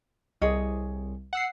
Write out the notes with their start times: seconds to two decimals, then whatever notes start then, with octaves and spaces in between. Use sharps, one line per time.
0.42 C2 G#4 C#5 D#5
1.33 F#5 E6 C7